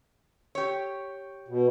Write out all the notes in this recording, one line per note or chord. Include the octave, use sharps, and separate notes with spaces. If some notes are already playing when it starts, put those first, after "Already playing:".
G4 C#5
B2